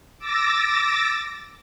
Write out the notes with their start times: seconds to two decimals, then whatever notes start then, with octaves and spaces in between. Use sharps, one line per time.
0.19 D6 E6 A6 A#6